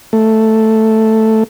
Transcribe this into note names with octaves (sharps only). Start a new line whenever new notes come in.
A3